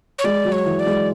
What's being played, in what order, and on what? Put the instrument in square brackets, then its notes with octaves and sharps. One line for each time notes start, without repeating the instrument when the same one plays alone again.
[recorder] C#5
[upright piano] G#3 [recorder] D5
[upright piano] F#3
[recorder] C#5
[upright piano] E3
[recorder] D5
[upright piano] G#3